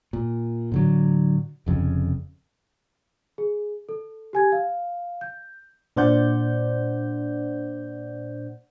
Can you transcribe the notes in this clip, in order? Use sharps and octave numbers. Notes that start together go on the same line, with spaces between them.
A#2
A2 D3 F#3
F1 F2 A2 C#3
G#4
A4
G4 G#5 G#6
F5
G6
A#2 D4 C5 D5 F#5 G6